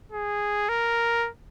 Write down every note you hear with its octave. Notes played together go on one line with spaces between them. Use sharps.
G#4
A#4